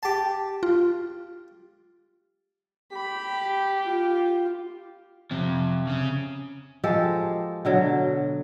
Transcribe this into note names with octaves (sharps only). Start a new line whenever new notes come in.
G4 A5
F4
G4 B5
F4
F2 C3 F3
C#3 C#4
F3 G#3 G4 A4
B2 D3 F#3